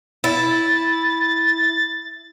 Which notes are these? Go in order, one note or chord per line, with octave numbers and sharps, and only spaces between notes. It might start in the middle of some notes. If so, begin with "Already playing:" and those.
E4 A6